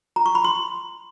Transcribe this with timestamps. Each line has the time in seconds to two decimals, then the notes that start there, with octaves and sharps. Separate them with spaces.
0.16 A#5
0.26 C#6
0.35 B5
0.45 C6